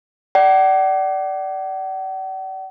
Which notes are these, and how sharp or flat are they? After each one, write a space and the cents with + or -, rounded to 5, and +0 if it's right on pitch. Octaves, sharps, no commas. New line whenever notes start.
D5 +0 F#5 +45